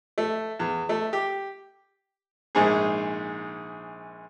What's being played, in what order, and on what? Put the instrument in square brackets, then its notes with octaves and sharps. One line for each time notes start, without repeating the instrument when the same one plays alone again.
[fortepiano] A3
E2
A3
G4
A#1 G#2 G#4